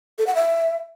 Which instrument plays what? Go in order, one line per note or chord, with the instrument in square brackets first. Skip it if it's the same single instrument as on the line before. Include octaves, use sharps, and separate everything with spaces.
[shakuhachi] A4
F#5
E5